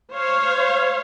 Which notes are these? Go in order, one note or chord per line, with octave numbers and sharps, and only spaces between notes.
C5 C#5 F5